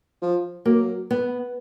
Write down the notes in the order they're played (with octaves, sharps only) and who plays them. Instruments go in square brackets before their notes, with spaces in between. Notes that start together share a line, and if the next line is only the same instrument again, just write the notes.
[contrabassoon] F3
[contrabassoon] F#3 [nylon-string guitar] A#3
[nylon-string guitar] B3